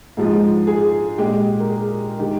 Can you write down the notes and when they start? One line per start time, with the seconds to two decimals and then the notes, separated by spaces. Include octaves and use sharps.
0.17 G#2 F3 G#3 G#4
0.67 G#4
1.18 A#2 G#3 G4
1.60 A#4
1.68 G#4
2.19 D#3 G#3 G4